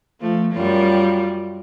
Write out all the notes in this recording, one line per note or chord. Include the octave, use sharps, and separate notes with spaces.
F3 A3
F#2 G3 F4